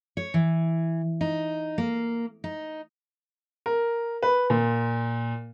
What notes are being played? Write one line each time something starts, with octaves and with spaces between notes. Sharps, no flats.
C#5
E3
D#4
A#3
D#4
A#4
B4
A#2